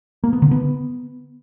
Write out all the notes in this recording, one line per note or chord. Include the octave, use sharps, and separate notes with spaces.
A#3
B3
D3
B3